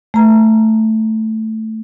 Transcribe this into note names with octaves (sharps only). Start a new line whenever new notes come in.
A3 A#5